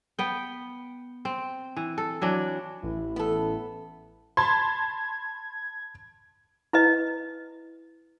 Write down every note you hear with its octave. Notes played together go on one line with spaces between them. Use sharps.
B3 G5
C4
E3
A4
E3 F#3 D4
A1 E4
B3 A4
A5 B5 C6 G#6
E4 B4 D#5